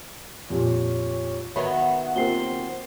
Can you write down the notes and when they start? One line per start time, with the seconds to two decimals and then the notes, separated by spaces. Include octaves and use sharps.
0.50 F2 A#2 F4 G4 C#5
1.56 D#3 F#3 B3 E5 F#5 B5
2.16 A#3 C4 F4 G4 A#4 C7 G7